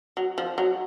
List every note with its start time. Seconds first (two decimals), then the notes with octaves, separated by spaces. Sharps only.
0.17 F#3
0.38 F3
0.58 F#3